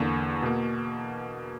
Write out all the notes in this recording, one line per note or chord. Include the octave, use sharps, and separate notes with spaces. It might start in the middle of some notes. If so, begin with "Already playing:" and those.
Already playing: E2 D3 A#3 C#6
B2 A#3